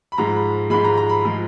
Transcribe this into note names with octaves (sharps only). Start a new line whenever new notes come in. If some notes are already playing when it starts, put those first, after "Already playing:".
B5
G#2 F3 G#3 A#5
B5
G#2 F3 G#3 B5
A#5
A#5
B5
F3 G#3